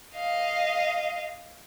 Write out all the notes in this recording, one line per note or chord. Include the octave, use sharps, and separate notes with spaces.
D#5 F5